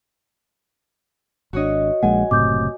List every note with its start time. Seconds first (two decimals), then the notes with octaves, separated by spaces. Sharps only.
1.53 G#1 D4 F#4 C#5 D#5
2.03 A#1 G#3 A#3 F#5 G#5
2.31 F#1 A2 C3 D6 D#6 G6